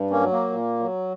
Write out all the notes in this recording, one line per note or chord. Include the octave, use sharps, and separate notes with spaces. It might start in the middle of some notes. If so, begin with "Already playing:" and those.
Already playing: G2
A#3 C#4
F#3
A#3
A#2
F#3